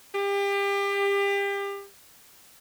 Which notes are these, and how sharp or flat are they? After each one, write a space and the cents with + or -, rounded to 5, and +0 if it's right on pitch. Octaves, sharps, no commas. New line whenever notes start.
G4 +30